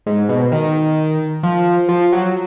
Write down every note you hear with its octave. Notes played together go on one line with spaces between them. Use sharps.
G#2
B2
D#3
F3
F3
F#3